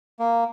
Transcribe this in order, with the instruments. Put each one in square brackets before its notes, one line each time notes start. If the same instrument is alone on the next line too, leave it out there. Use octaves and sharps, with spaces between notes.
[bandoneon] A#3